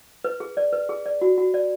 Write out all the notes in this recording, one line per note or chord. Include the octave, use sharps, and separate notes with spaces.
B4
G#4
D5
B4
G#4
D5
F#4
F#4
D5